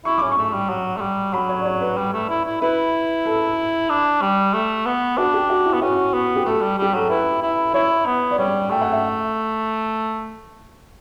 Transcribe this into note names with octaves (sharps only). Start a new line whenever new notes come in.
E4 C#6
C#4 D6
C#6
A3
G3
F#3
A3
G3
F#3 B5
C#5
D5
C#5
B4
G3
A3
E4
E4
E4 B4
A4
D4
G3
A3
B3
D4 F#4
G4
F#4
E4
B3
C#4 F#4
B3
G4
A3 A4
G3
G3 G4
F#3 A4
E4 B4
E4
E4 C#5
B3
D5
G3 C#5
A3 G5
F#5
E5